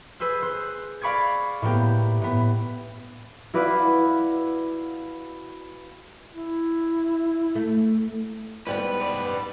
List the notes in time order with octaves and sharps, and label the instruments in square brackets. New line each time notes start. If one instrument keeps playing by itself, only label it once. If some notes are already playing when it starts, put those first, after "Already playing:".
[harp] G#4 B4 C5 E6
C5 C6 F#6
D5 F5 B5 C#6 D6 G#6
A2 A#3 B3 G4
A2 B3
E4 F#4 B4 D5 F5
[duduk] E4
[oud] A3
[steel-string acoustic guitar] G#2 G3 B3 [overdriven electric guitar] B4
[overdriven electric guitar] B4 D5